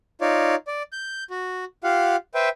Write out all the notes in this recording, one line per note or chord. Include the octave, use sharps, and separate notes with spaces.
D#4 F4 C#5 D5
D5
G6
F#4
F4 G4 F5 F#5
B4 C5 E5 G5